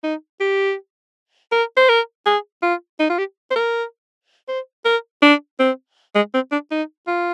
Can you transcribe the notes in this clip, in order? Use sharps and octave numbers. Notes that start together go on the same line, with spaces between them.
D#4
G4
A#4
C5
A#4
G#4
F4
D#4
F4
G4
C5
A#4
C5
A#4
D4
C4
G#3
C4
D4
D#4
F4